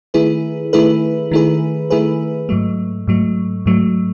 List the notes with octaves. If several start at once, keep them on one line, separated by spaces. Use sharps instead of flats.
D#3 A3 E4 G#4 B4
D#3 A3 E4 G#4 B4
D#3 A3 E4 G#4 B4
D#3 A3 E4 G#4 B4
G#2 F#3 A3
G#2 F#3 A3
G#2 F#3 A3